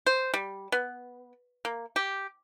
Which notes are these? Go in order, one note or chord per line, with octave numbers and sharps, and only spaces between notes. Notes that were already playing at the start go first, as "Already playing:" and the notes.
C5
G3
B3
A#3
G4